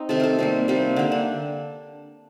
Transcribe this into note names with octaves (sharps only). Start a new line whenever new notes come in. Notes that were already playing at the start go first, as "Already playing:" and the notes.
Already playing: C4 D#4
C3 D#3 A3 A4
A4 A#4
C3 G3 A#3 C4
C3 G3 A#3
D3 G3 A#3
D4